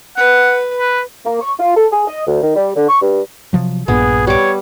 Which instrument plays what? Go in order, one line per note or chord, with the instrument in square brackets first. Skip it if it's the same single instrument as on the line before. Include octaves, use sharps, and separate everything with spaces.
[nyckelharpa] B4 [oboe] F#5
[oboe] B4
[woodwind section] A#3
C#6
F4
A4
G#4
D#5
D2
D#3
G3
D3
C#6
G2
[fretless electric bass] C3 F3 F#3
[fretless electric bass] A#1 G2 A#2 [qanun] B3 [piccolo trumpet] G#4
[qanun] G3 D6 [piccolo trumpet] C#5